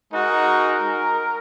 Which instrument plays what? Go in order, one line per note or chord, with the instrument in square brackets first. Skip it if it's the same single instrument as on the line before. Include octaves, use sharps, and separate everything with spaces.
[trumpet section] G#3 D#4 F#4 A#4